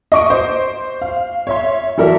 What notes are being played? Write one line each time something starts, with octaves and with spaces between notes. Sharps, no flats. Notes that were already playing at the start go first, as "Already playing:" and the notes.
D#5 C#6 D7
C5
F5
C#5 E5 C6
E3 F#3 A4 A#4 D5 E5